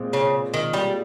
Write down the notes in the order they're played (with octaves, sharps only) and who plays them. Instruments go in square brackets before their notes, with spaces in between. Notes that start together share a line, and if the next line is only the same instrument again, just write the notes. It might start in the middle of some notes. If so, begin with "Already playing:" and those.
Already playing: [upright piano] A#2 G#3 C4
[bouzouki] C#3
D#3
G3